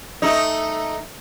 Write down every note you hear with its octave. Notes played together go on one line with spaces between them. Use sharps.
A3 D#4